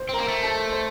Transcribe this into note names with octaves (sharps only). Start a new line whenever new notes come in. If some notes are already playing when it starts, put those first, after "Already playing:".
Already playing: C5 C6
C4 A#4 A#5
A#3
A3
A4 A5
C5 C6